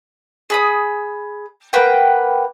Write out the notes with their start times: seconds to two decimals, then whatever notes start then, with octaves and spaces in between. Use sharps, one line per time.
0.50 G#4 B5 D#6
1.73 A#3 B4 F#5 G5